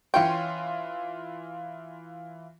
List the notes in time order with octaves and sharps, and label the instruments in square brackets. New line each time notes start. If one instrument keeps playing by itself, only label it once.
[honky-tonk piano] E3 F4 C6 [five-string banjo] C#4 C#5 G5